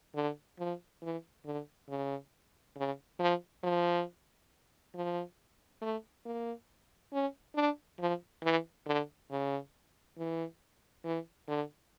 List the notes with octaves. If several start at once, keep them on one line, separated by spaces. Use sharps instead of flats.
D3
F3
E3
D3
C#3
C#3
F3
F3
F3
A3
A#3
C#4
D4
F3
E3
D3
C#3
E3
E3
D3